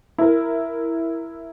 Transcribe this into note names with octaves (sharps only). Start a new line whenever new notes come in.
E4 A#4